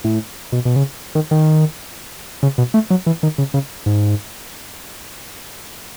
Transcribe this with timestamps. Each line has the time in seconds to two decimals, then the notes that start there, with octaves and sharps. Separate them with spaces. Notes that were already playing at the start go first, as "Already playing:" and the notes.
0.04 A2
0.52 B2
0.65 B2
0.76 C#3
1.15 D#3
1.31 D#3
2.43 C#3
2.58 B2
2.74 A3
2.90 F#3
3.06 E3
3.23 D#3
3.38 C#3
3.54 C#3
3.86 G#2